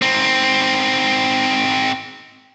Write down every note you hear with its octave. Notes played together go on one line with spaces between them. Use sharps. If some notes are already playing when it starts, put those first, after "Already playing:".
G#2 C4